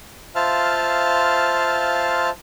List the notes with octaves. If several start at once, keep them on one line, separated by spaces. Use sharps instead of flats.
F4 C5 E5 F5 A5 F6